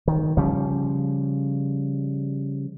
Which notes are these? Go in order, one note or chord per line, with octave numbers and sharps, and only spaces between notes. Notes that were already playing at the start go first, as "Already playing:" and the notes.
D#3
C#3 F3 G3